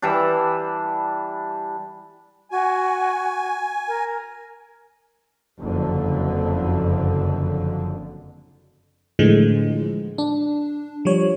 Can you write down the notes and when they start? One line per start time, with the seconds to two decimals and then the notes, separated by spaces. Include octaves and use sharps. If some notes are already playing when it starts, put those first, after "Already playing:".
0.02 E3 G3 D4
2.51 F#4 G#5
3.88 A#4
5.60 F#1 F2 D3
9.19 A2 D3 E3 F3 G#3
10.18 D4
11.05 F3 G3 C#5